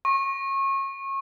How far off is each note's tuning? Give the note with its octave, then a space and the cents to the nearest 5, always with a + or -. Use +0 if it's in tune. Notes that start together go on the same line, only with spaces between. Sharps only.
C#6 -30